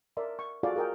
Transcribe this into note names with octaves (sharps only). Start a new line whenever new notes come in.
A#4 D5 E5 C6
C#6
F4 F#4 G#4 A4 D5 F5
G#4 A#4 G5